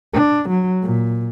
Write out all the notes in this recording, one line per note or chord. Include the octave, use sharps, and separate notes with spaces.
D4
F#3
A#2